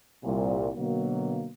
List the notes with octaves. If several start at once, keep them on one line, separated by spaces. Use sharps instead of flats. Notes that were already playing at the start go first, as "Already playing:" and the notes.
C2 A#2
B2 D3 F#3 A#3